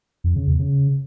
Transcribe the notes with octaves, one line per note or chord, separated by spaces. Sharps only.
F2
C#3
E2
C#3